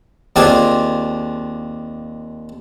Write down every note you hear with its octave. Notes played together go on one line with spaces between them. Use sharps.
D#2 C4 D4 F4 G#4 G#5